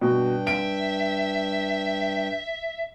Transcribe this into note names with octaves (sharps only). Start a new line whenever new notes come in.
G2 B2 G5
E5 D7